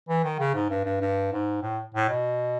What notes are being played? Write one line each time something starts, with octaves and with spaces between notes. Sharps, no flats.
E3
D#3
C#3
G#2
G2
G2
G2
G#2
A2
A2
B2